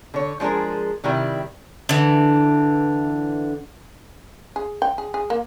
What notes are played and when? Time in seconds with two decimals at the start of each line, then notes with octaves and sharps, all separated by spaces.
0.14 D3 C#5
0.40 F3 G#3 D4 G#4 A#4
1.04 C3 D#3 G3 E4
1.89 D3 E3
4.56 G#4
4.82 G5
4.98 G#4
5.14 G#4
5.30 A#3